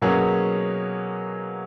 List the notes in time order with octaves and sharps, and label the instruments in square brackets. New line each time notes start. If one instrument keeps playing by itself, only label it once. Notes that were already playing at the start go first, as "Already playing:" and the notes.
[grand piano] B2 F#3 A#3 C#4 G#4